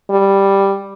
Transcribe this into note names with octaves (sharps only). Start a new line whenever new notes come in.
G3